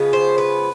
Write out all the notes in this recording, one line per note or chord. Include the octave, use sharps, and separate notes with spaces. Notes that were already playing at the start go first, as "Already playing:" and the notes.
Already playing: C#3 F3 G#3 B3
C5
B4